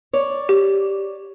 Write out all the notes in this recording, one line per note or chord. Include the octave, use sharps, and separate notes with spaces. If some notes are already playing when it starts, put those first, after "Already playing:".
C#5 D5
G4